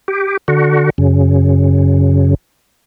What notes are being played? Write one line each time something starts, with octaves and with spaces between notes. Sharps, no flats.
G4
D3 F#4
F#2 C#3